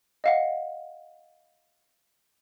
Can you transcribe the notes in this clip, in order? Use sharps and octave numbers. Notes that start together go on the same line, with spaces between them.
D#5 F5 F#5